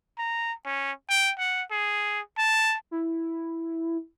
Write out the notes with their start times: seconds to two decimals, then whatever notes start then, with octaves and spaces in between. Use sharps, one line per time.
0.18 A#5
0.66 C#4
1.09 G5
1.39 F#5
1.71 G#4
2.37 A5
2.91 E4